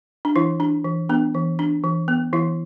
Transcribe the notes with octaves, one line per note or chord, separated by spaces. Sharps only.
D4
E3 E4
D4
E3
B3 D4
E3
D4
E3
B3
E3 E4